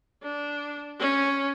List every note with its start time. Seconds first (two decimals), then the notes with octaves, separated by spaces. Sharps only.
0.23 D4
1.00 C#4